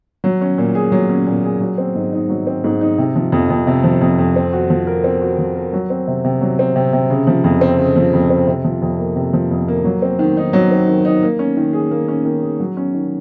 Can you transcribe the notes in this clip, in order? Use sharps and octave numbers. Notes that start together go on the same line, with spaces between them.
F#3
C#4
A#2
G#4
F#3
C#4
A#2
G#4
F#3
C4
G#2
D#4
F#3
C4
G#2
D#4
C3
F3
F2
F2
C3
F3
F2
F2
C4
F#4
F3
A#4
C4
F#4
F3
A#4
F#3
C4
C3
C3
F#3
C4
C3
C3
C#3
F3
F2
C4
C#3
F3
F2
C4
C3
F3
F2
A#3
C3
F3
F2
A#3
F#3
C4
D#3
D#4
F#3
C4
D#3
D#4
A#3
C#4
D#3
G#4
A#3
C#4
D#3
G#4
F#3
C#4
D#3